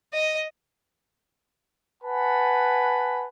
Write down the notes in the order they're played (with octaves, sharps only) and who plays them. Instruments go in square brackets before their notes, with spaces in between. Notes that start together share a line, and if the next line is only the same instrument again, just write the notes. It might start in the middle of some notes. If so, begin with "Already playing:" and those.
[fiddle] D#5
[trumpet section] B4 F#5 G#5 A5 B5